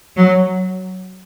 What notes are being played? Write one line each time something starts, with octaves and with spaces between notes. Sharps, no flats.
F#3